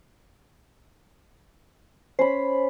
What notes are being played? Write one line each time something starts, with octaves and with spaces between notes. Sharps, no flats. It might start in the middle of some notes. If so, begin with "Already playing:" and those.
C#4 C5 B5